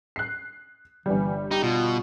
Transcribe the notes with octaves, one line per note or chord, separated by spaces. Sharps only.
F#6 C7
G1 E3 G3
D#4 G4
B2 F4